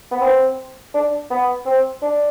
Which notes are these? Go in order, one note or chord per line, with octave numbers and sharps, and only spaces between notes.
B3
C4
D4
B3
C4
D4